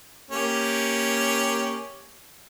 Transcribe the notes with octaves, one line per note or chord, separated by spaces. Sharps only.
A#3 C#4 G4